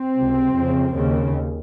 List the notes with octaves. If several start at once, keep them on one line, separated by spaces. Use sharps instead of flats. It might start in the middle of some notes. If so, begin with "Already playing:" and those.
Already playing: C4
C#2 C3
F2 C#3
D#2 C#3